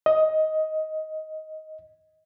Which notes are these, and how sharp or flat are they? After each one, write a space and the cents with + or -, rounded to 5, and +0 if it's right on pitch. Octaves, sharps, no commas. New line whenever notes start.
D#5 +10